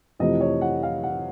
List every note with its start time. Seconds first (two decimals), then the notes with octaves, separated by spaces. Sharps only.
0.20 F2 C3 E3 A3 C4 D#5
0.40 C#5
0.61 F#5
0.83 F5
1.03 F#5